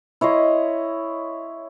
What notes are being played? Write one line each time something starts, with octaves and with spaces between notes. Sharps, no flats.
E4 C#5 D#5 C6